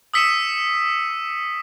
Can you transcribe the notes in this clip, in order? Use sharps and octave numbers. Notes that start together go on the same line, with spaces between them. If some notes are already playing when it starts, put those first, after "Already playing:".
D#6 E6 B6 C#7 D#7 E7